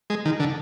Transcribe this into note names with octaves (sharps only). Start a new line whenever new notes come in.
G#3
D#3
D3